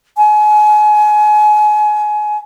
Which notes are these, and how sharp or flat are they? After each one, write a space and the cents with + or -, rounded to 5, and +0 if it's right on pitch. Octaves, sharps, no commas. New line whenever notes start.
G#5 +30